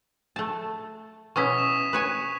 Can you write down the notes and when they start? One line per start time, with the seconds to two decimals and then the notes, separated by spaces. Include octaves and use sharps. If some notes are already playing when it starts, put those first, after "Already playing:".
0.36 A3 A5
1.36 B2 C#4 E4 C#6 D#6 B6
1.58 E7
1.93 B4 C#5 G#5